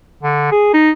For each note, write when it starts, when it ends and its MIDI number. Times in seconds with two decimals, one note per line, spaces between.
0.23 0.49 50
0.52 0.71 68
0.73 0.91 63